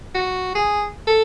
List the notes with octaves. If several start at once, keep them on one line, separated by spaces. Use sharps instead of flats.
F#4
G#4
A4